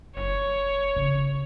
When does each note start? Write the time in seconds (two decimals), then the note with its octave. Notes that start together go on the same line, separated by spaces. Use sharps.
0.17 F#1 C#5
0.96 C#3